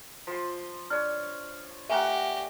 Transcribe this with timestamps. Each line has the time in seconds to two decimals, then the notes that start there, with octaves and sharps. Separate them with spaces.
0.27 F3 C6
0.90 D4 C#5 F6
1.90 A3 G4 A#4 E5 F#5 G#5